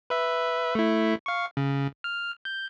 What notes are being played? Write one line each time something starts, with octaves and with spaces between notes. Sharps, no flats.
B4 E5
A3 E4
F5 C#6
C#3
F6
G6